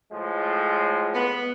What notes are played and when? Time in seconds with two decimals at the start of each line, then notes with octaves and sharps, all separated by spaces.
0.12 A2 F3 G#3
1.14 B3